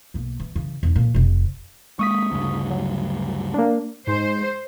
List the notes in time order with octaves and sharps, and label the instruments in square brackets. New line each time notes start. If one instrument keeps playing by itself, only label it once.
[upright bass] B1 A#3
E3
C#3 E3
E2 D#4
F2 A#2
F1 C3
[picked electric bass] G#3 A#3 [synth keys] C#6 D#6 B6
[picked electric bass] D2 G2 C#3
[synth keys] F#3
A#3 D4
[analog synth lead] G#2 [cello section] C5